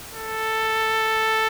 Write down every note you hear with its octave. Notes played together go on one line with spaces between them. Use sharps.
A4